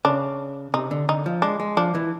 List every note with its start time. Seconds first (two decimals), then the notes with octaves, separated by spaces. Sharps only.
0.05 C#3 D4
0.74 C3 D#4
0.91 D3
1.09 D3 D#4
1.26 F3
1.42 G#3 D4
1.60 G#3
1.77 F3 D4
1.95 E3